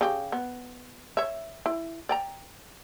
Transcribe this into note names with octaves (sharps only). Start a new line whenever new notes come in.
C#3 G4
B3
C#5 E5
E4
D5 G5 A#5